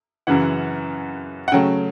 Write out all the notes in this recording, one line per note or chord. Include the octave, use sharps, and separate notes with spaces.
F#2 C#3 E3 F#5
F#5
C#3 F#3 A3 G5